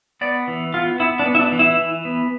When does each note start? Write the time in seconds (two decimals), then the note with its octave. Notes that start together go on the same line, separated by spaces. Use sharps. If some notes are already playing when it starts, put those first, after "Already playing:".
0.21 B3 D5
0.48 E3
0.74 B3 F4
1.00 B3 E4
1.19 D4
1.26 B3
1.35 E4
1.39 D4
1.52 E3
1.59 E4
1.79 E3
2.05 B3